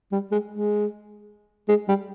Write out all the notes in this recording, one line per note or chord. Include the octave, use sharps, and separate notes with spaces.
G3
G#3
G#3
G#3
G3